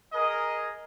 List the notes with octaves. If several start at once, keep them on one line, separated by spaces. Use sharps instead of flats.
G#4 A#4 D#5